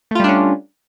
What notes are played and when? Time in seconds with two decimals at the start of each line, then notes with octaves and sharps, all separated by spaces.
0.11 A3
0.15 F4
0.20 G3
0.24 D4
0.28 C#4